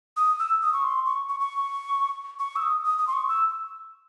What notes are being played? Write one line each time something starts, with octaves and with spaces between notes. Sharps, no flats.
D#6
E6
D#6
C#6
C6
C#6
C#6
C#6
C#6
E6
D#6
D#6
D#6
C6
C#6
E6